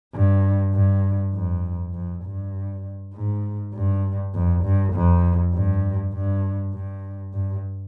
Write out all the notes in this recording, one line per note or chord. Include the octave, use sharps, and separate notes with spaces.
G2
G2
F2
F2
G2
G#2
G2
F2
G2
F2
G2
G2
G2
G2